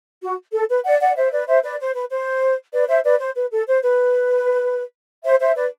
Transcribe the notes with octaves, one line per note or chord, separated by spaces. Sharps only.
F#4
A4
B4
D5 F#5
D5 F#5
C5 E5
B4 D5
C5 E5
B4 D5
C5
B4
C5
B4 D5
C5 E5
B4 D5
C5
B4
A4
C5
B4
C5 E5
C5 E5
B4 D5